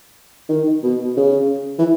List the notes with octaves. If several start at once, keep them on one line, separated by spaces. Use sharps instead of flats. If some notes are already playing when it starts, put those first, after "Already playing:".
D#3
B2
C#3
E3